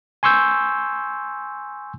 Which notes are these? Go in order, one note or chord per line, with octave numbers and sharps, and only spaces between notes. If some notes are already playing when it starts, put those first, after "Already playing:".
G#5 C6 C#6 E6 G6